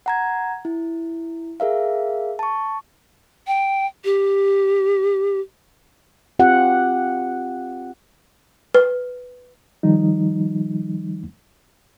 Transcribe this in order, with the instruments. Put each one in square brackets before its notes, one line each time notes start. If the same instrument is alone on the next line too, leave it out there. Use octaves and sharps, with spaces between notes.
[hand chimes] F#5 A#5 G#6
E4
G#4 A#4 E5 F5
A5 C#6
[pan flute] G5
G4
[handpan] C4 F4 G4 F#5
[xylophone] B4
[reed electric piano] D#3 F3 G3 D#4